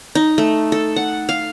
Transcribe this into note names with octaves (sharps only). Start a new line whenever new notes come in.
D#4
A3
A4
F#5
F5